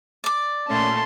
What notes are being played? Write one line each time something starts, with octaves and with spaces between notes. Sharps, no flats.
D5 D6
A#2 A3 C#4 A5 C6